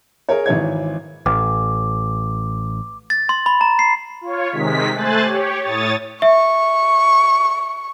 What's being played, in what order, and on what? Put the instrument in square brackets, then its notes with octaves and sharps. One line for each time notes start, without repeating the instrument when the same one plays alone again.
[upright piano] G#4 A#4 C#5
G#1 E3 C#5 G#6
[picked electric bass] A1 [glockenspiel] D6
[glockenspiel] A6
C6
B5
A#5
C7
[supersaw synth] F4 C#5
C3 D#3 G#3 B6
A3 C5 G#5 F#6 A6
G4 C#5
A2 C#5 D#6 A6
[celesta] E5 [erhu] C#6